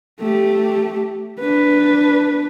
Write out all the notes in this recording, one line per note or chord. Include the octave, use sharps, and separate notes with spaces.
A3 G4
D4 B4